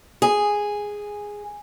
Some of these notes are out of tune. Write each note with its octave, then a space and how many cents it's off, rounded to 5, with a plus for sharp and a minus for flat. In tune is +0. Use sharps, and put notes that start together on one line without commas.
G#4 -5